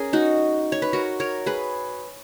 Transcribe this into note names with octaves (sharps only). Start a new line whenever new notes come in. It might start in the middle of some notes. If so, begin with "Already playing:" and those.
Already playing: C#4 G#4 A#4
D#4 F#4
C#5
B4
F#4 A#4
A#4 C#5
G#4 B4